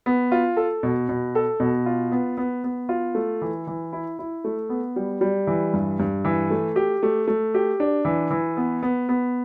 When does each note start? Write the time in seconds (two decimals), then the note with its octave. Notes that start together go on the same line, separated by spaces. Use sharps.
0.06 B3
0.32 F4
0.57 A4
0.83 B2
1.09 B2
1.35 A4
1.60 B2
1.86 F4
2.12 B3
2.37 B3
2.64 B3
2.89 F4
3.15 A3
3.42 E3
3.67 E3
3.93 E4
4.19 E4
4.44 A3
4.69 B3
4.96 G3
5.21 G3
5.47 E3
5.73 G2
5.99 G2
6.25 E3
6.50 A3
6.76 G4
7.03 A3
7.28 A3
7.54 G4
7.80 D4
8.05 E3
8.31 E3
8.57 B3
8.83 B3
9.09 B3